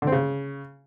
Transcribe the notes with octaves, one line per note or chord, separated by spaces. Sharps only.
D3
C4
C#3